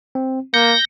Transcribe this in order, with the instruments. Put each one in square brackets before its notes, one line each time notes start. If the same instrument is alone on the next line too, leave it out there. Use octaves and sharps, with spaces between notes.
[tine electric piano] C4
[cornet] A#3 [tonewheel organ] G6 A#6 [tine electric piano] C#7